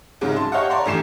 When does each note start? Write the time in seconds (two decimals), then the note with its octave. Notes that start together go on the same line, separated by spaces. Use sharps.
0.21 C2 G#2 C#3 F#3 G#3
0.36 A5 C6
0.52 G4 C#5 D#5 F5 F#5
0.70 C#5 D5 A5 A#5 C6
0.86 A#1 A2 E3 G4 C7 E7